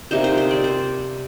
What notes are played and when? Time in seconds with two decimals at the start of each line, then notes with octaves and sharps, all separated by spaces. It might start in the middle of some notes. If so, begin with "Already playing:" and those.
0.11 C3 G3 A#3 D#4 C5
0.24 C5
0.37 C5
0.51 D5
0.64 C5